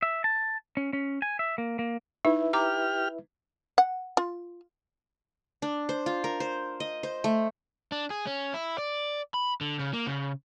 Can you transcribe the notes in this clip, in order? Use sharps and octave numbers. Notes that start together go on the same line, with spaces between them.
E5
A5
C#4
C#4
G#5
E5
A#3
A#3
D#4 E4 B4 E5
G4 A#5 D6 F6
F#5
F4
D4
C5
F4
A#4
C5
D#5
C5
A3
D4
G#4
C#4
E4
D5
B5
D3
C#3
A#3
C#3